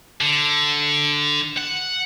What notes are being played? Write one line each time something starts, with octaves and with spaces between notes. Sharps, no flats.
D3
F#5